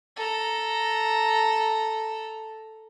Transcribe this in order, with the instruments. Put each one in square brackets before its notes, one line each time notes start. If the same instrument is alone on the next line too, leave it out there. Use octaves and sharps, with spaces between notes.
[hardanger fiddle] A4 A#5